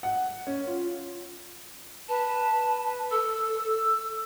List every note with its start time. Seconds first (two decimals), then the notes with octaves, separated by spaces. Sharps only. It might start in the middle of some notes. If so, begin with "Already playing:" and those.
0.03 F#5
0.47 C#4
0.66 F4
2.08 B4 A5
3.10 A4 E6